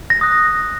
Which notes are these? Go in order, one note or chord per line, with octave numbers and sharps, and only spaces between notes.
A#6
D#6 F#6